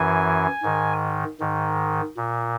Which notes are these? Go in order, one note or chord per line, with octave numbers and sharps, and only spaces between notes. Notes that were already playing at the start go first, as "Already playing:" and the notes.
Already playing: F#2 E3 G#5
G#2 D#3
G#2 D#3
A#2